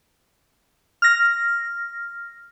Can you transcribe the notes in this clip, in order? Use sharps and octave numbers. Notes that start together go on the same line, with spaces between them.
F6 A#6